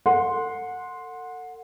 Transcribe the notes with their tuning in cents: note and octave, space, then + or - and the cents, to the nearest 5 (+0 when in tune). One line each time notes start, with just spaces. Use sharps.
A4 +40 F#5 -20 C6 +0